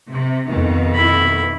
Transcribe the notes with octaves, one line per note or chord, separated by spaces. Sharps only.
C3
F2 B2 D#3
E4 B5